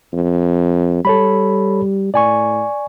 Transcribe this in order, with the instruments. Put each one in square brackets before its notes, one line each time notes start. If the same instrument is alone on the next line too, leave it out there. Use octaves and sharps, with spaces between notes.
[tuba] F2
[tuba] G3 [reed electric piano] A4 C#5 B5
[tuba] A2 [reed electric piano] D5 G#5 C#6